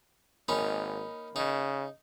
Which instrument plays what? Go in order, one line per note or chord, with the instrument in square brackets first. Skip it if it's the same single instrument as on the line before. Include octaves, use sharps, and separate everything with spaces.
[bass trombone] G#1 [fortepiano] A#3 B5 [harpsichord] C#4 D#4
[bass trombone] C#3 [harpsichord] D#4